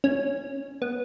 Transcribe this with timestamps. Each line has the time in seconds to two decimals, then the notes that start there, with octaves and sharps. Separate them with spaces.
0.04 C#4
0.82 B3